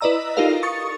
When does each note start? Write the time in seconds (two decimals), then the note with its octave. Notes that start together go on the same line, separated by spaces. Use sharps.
0.01 E4 B4 D5 D#5 A#5 E6
0.37 D#4 F4 G4 A4 A#4 F5
0.63 C#6 D#6 A6 C#7